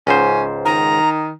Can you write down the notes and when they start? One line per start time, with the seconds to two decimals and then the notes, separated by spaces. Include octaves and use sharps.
0.07 C#2 G#2 C#4 C5
0.65 D#3 A#5